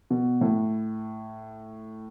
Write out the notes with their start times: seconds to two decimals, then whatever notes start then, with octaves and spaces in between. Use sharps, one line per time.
0.10 B2
0.41 A2